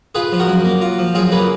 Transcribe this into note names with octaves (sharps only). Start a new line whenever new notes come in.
F4 G#4 B4
F3
F#4 A#4
F#2
A#3
F4
F3
F#2 F4 G#4
A#3 G#4 B4